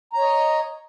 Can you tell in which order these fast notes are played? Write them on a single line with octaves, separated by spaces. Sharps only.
A#5 C#5 D#5